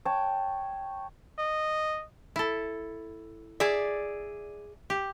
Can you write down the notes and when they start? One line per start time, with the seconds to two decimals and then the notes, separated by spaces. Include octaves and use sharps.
0.05 C#5 G5 A5
1.39 D#5
2.36 E4 A4
3.60 G#4 D5 E5
4.90 G4